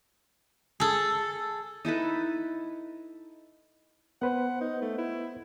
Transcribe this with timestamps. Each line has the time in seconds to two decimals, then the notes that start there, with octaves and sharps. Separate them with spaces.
0.80 G#4 A4
1.85 D#4 E4 A4 B4
4.22 B3 B4 C5 F#5
4.61 D#4
4.82 A3
4.98 E4